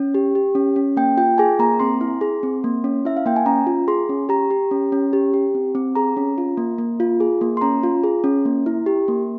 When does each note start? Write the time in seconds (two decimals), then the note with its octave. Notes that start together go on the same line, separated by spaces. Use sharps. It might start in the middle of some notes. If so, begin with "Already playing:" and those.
Already playing: C#4
0.14 G4
0.35 G4
0.55 C#4
0.76 C#4
0.97 A#3 G5
1.17 F4 G5
1.38 G#4 G#5
1.59 A#3 A#5
1.80 C4 C6
2.01 E4
2.21 G#4
2.43 C4
2.64 A#3
2.84 C#4
3.05 E4 E5
3.17 F5
3.26 A#3 G5
3.36 G#5
3.46 C#4 A#5
3.67 F4
3.88 G#4 C6
4.09 C#4
4.29 G4 A#5
4.51 G4
4.71 C#4
4.92 C#4
5.13 G4
5.34 G4
5.55 C4
5.75 C4
5.95 G#4 A#5
6.17 C#4
6.38 F4
6.57 A#3
6.78 A#3
7.00 F4
7.20 G#4
7.41 A#3
7.57 C6
7.61 C#4 A#5
7.83 F4
8.04 G#4
8.24 C#4
8.45 A#3
8.66 E4
8.86 G4
9.08 A#3